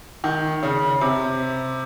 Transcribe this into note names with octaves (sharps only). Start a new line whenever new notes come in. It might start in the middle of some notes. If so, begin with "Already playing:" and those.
D#3
C#3
C3